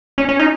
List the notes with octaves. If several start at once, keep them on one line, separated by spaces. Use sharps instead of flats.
C#4
C#4
D#4